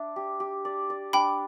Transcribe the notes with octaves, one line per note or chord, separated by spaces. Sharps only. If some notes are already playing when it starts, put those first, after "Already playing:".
Already playing: D4 E5
G4
G4
D5
D5
D4 G5 B5